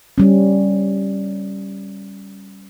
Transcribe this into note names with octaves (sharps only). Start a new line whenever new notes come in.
G3 C#4